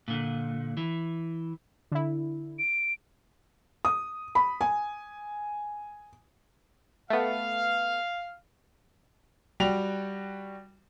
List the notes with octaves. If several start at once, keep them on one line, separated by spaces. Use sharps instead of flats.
A#2 D3
E3
D3 E4
D7
D#6
B5
G#5
A3 B3 F5
G3 F#4 G5 F7